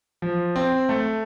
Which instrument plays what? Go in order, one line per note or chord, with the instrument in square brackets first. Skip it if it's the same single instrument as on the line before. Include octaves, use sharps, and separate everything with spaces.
[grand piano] F3
C4
A3